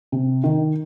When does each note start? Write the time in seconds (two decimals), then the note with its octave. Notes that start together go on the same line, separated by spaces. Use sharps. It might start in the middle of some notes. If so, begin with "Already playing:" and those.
0.12 C3
0.44 D#3